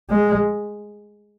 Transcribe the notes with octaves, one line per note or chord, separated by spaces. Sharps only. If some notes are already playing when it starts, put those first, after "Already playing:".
G#3